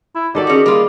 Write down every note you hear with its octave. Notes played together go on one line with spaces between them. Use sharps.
E4
D#3 F#4 G4 A4 D5
C#4 F#4 G#4
G3 A#3 F4